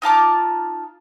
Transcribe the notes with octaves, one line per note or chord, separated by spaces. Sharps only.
D#4 F4 A5 D6